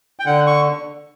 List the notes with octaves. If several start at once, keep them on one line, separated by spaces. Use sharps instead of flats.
G5
D3 F#5
C#6